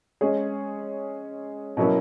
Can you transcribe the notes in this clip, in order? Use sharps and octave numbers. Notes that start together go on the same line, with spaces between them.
G#3 C#4 G#4 C#5
B2 F#3 A#3 C#4 E4